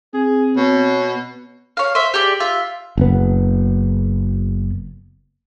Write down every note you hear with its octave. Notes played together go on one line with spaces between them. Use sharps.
C4 G#4
B2 C#5
C#5 F5
C5 E5
G4 G#4 D5
F4 E5
F#1 B3